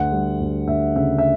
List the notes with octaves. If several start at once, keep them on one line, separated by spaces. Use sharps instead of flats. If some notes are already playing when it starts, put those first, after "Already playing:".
Already playing: D2 F#5
G3
D2
D2 E5
C#3 E5
E5